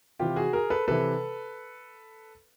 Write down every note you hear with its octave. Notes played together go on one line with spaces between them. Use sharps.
C3 E3 F4 G4
F#4 G#4
G#4 A#4
A4 B4
C3 E3 A4 B4